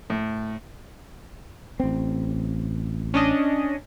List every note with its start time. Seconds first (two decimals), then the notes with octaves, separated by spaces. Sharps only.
0.10 A2
1.80 A1 C4
3.14 C#4 D4 D#5